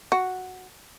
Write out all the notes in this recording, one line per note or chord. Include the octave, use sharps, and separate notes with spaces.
F#4